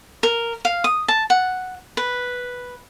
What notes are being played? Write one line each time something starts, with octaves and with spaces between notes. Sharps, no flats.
A#4
F5
D#6
A5
F#5
B4